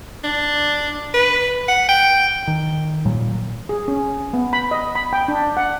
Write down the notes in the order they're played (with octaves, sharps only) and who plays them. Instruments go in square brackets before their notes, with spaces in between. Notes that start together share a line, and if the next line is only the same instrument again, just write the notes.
[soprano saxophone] D4
B4
F#5
G5
[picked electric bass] D#3
A#2 F#3 G3
[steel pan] G#4
C#4
B3
B5
D#5
B5
G5
D4
F#5